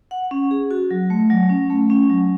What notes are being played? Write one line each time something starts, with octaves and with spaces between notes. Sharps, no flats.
F#5
C#4
G#4
F#4
F#3
A3
F#3
C#4
A3
C#4
F#3